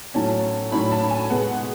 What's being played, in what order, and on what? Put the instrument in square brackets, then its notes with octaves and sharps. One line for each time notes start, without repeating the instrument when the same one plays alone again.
[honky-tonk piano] A2 F#3 C#4 A5
A2 F#3 C#4 B5
A5
G#5
B2 G#3 B3 F#5